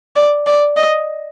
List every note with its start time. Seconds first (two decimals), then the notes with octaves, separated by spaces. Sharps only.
0.16 D5
0.46 D5
0.77 D#5